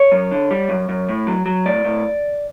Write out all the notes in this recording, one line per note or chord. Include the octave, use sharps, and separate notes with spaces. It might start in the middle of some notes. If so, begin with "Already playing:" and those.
Already playing: C#5
F#2
D3
G3
F#2
F#2
A2
F#3
F#3
A2 D5
A2